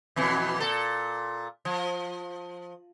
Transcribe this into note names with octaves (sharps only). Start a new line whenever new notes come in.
F2 B2 E3
A#2 A4
F3